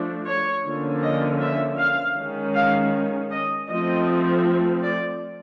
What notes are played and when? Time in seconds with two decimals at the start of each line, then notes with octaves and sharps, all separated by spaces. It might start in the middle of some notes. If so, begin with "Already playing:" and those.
Already playing: F3 A3 D4
0.26 C#5
0.64 D3 F3 A#3 C#4
1.02 D#5
1.40 E5
1.78 F5
2.17 D#3 G#3 C#4
2.55 F5
3.31 D#5
3.69 F3 A3 C4 D#5
4.83 D5